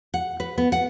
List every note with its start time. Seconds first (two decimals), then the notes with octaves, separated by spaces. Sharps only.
0.14 F#5
0.40 B4
0.58 B3
0.72 F#5